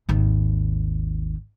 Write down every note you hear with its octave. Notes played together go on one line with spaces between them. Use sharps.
G#1 D#2